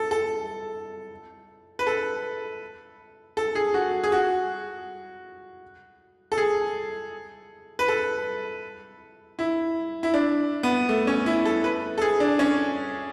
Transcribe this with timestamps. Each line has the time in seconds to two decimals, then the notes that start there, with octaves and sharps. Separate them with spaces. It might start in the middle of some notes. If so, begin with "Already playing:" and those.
Already playing: A4
0.11 A4
1.79 B4
1.87 A4
3.37 A4
3.55 G#4
3.74 F#4
4.04 G#4
4.12 F#4
6.32 A4
6.38 G#4
7.79 B4
7.88 A4
9.39 E4
10.03 E4
10.14 D4
10.63 B3
10.89 A3
11.07 C#4
11.26 E4
11.45 A4
11.64 B4
11.98 A4
12.02 G#4
12.20 D4
12.39 C#4